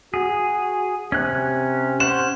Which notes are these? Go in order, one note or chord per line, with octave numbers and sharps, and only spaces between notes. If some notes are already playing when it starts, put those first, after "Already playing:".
F#4 G#4
C3 C#4 F#6
C#4 C5 F#5 E7